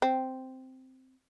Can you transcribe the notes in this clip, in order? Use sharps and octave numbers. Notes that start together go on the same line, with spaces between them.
C4